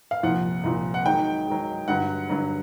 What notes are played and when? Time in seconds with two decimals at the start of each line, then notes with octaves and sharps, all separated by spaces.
0.11 F5
0.23 C2 A#2 F3 F#5
0.64 C2 A#2 F3
0.94 F#5
1.05 G#2 D#3 F#3 G5
1.47 G#2 D#3 F#3
1.88 G2 D3 F#3 F#5
2.29 G2 D3 F#3